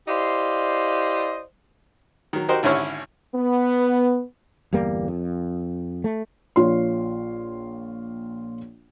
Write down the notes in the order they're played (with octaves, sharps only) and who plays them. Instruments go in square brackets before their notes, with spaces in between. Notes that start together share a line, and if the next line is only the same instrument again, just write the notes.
[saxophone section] E4 G4 C5 D5 D#5 F5
[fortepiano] D#3 F#3
D#4 F#4 G4 A#4 C5 D#5
G#1 D3 C#4 E4 C#5 F6
[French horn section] B3
[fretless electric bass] G1 E2 G3 A#3
F2
A3
[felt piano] A#1 F4 C#5 C6